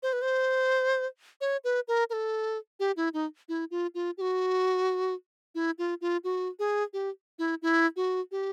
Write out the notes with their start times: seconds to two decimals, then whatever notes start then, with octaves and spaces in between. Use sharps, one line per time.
0.03 C5
0.13 B4
0.22 C5
1.41 C#5
1.64 B4
1.88 A#4
2.10 A#4
2.13 A4
2.80 G4
2.97 E4
3.14 D#4
3.49 E4
3.71 F4
3.95 F4
4.18 G4
4.21 F#4
5.55 E4
5.78 F4
6.01 F4
6.24 F#4
6.59 G#4
6.93 G4
7.39 E4
7.62 E4
7.96 F#4
8.32 G4